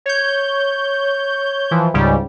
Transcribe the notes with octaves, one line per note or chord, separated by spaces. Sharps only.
C#5 G6
E3 F3
C#2 G#2 C#3 G3